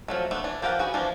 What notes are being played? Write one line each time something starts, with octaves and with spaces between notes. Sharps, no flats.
F3 F#3 A3
A3 B3 D4
E3 D4
F3 G4 A#4 F5 F#5
F#4 G#4 B4
E3 F3 A#3 D4